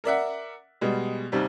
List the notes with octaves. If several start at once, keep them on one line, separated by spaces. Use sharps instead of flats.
A#4 D5 E5 F#5
B2 G3 G#3
D#2 C3 G3